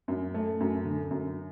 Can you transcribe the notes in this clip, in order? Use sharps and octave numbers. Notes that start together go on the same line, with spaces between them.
F#2
A3
F#2
D3
F#2